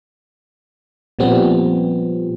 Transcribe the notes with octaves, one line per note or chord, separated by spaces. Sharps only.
A#2 F3 G3 B3 C4